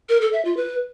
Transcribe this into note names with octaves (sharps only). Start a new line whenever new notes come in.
A#4
A4
E5
F4
B4